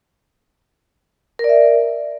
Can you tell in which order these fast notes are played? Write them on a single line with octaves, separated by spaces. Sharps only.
A#4 D5 E5